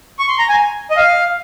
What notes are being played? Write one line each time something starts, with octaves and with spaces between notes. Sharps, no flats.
C#6
C6
A#5
G#5
D#5
F5